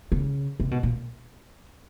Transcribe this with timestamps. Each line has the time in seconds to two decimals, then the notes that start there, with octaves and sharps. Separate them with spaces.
0.12 C#3
0.60 C3
0.71 B2
0.83 A#2